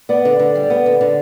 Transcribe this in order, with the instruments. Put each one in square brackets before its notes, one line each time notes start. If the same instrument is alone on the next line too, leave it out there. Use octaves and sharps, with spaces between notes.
[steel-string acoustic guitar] B3 [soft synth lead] D5
[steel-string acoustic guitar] D3
D3
G3
B3
D3
D3